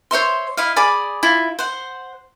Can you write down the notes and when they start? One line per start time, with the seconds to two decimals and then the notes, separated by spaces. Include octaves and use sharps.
0.11 C5 C#5 E5 C6
0.57 E4 D#5 F5
0.76 G#4 D5 B5 D6
1.23 E4 F4
1.59 C5 F#5